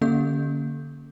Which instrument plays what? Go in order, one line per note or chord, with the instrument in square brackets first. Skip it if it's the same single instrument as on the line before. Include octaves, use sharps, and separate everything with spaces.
[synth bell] D3 A#3 C#4 A4 G6